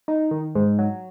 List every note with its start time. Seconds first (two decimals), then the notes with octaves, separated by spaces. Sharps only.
0.08 D#4
0.31 D#3
0.55 G#2
0.79 F#3